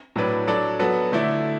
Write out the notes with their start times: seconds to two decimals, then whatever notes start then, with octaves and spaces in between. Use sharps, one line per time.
0.16 A2 F#3 D4 B4 D5
0.47 F#3 D4 A4 D5
0.79 F#3 B3 F#4 A4
1.12 D3 A3 E4 D5